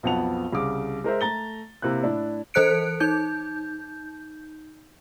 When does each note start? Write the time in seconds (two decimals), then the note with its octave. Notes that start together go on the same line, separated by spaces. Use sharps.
0.03 B1 F2 B3 F#5 A5 F7
0.53 C2 C#3 D6
1.04 G#3 A#4 C5 E5
1.21 A3 A#5 A6 G7
1.82 C3 A#3 E4 F#6
2.03 A2 D4 E4
2.54 E3 A4 C5 F#6 C#7 D7
3.00 D#4 G6